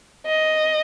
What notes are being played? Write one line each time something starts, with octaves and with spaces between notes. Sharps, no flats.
D#5